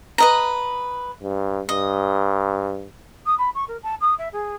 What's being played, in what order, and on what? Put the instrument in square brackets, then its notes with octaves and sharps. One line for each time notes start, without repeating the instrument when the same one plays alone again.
[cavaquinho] B4 D#5 A#5
[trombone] G2
[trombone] G2 [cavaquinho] D#5
[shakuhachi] D#6
B5
C#6
A#4
A5
D#6
E5
G#4